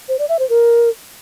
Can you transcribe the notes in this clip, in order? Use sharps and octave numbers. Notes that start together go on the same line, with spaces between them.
C5
D5
E5
C5
A#4